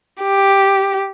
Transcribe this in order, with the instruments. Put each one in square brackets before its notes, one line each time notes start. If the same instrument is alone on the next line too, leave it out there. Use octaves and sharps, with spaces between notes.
[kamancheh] G4